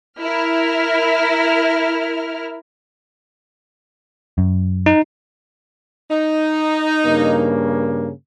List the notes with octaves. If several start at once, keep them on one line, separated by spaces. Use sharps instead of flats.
E4 A#4 F6
F#2
D#4
D#4
G2 C#3 A#3